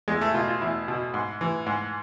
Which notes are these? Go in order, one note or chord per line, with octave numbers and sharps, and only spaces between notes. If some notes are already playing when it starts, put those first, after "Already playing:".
E2 G#3
A3
B2 F4
F4
E2 E4
B2
G#2
E3
G#2